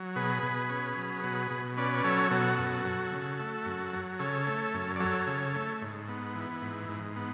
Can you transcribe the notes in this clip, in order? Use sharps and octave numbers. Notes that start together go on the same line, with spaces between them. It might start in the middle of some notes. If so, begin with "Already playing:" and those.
Already playing: F#3
B2 G#4 B4
B2
C#4
F#3
B2
B2
C#4 B4 D5
D5
F#3 A4 C#5
B2 F#4 A4
F#2
F#3
C#3
A3
F#2
F#3
C#3 A4 C#5
A3
F#2
D5
F#3 A4 C#5
C#3
A3
G#2
B3
E3
G#2
G#2
B3